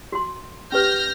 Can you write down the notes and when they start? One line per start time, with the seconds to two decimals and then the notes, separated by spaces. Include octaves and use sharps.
0.12 F#4 C6
0.72 C#4 G4 B4 F6 G6 A#6